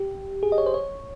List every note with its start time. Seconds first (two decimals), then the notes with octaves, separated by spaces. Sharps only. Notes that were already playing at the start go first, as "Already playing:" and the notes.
Already playing: G4
0.43 G#4
0.52 D#5
0.58 C#5
0.66 C5
0.74 C#5